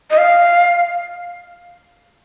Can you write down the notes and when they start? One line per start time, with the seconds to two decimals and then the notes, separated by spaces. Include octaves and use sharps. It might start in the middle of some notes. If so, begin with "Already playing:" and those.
0.10 D#5
0.18 F5